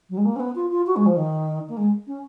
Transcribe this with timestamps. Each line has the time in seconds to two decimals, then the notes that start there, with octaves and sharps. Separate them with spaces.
0.09 F#3
0.17 G#3
0.25 A#3
0.35 C#4
0.39 B3
0.55 F4
0.70 F4
0.86 F#4
0.95 G#3
1.05 F3
1.16 D#3
1.68 A#3
1.76 G#3
2.06 C#4